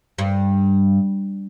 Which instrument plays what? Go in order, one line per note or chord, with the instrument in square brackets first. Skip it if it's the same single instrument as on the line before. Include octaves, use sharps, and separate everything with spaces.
[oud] G2